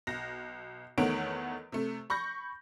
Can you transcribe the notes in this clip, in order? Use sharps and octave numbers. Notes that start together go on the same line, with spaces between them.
B1 A#6
E2 D#3 A3 B3 C#5 D7
C3 A3
B5 C#6 G6 A#6